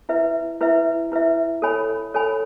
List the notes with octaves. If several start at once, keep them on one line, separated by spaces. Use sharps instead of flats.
E4 B4 E5
E4 B4 E5
E4 B4 E5
A4 C#5 G#5 B5
A4 C#5 G#5 B5